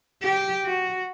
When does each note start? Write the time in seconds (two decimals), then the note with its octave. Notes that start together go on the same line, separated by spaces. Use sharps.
0.23 G4
0.65 F#4